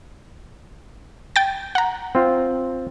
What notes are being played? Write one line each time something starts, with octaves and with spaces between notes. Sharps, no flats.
G5 A6
F#5 A#5
C4 F4